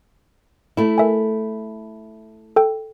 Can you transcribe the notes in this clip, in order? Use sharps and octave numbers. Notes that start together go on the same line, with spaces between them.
A3 E4
A#4 E5 G#5
A4 G5